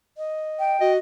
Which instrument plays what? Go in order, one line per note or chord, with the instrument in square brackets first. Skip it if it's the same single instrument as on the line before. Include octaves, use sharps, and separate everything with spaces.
[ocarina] D#5
[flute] G5
[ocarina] F#4 [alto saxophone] D#5